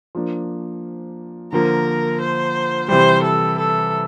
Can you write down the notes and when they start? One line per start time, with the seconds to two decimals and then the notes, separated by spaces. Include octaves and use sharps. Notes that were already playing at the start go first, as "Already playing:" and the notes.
0.15 F3 A#3 D4
1.52 D3 F3 A#3 A#4
2.21 C5
2.88 C3 E3 G3 C5
3.23 A4
3.58 A4